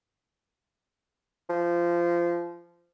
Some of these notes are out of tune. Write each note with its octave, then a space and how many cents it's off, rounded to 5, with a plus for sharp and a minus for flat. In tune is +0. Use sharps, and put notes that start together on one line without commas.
F3 -20